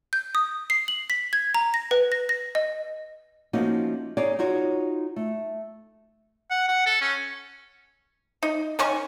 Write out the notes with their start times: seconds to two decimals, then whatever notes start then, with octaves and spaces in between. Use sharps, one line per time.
0.13 G6
0.35 D#6
0.70 C7
0.88 F#7
1.10 B6
1.33 G#6
1.54 A#5
1.74 A#6
1.91 B4
2.12 A#6
2.29 A#6
2.55 D#5
3.53 F3 A3 A#3 C#4 D#4 F#4
4.17 D#4 G#4 C#5 D5
4.39 D#4 F4 F#4 C#5
5.16 A3
6.51 F#5
6.68 F#5
6.86 A4
7.01 C#4
8.43 D#4
8.79 D#3 C#4 C#6